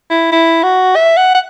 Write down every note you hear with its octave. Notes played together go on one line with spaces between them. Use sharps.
E4
E4
F#4
E5
F#5
F#5